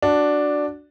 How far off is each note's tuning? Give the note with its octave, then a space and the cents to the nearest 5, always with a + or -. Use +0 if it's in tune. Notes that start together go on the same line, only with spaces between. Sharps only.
D4 +0 F#4 +0